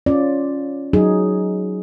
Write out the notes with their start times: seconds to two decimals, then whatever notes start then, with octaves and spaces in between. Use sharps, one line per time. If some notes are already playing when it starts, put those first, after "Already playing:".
0.06 C#4 F4 D5
0.93 F#3 D#4 G#4